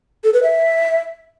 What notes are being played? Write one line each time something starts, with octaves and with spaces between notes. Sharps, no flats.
A4
B4
E5